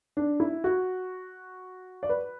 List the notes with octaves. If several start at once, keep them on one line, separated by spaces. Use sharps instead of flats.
D4
E4
F#4
D5
B4